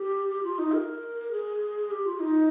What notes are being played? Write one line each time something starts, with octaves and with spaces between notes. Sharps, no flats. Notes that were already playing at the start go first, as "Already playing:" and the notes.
Already playing: G4
F4
D#4
A#4
G#4
G4
F4
D#4